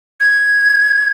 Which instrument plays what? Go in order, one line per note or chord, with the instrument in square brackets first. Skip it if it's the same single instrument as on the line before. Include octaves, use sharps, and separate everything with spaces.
[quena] G#6